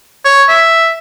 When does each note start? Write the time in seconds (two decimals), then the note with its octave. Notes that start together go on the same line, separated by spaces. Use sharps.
0.25 C#5
0.49 E5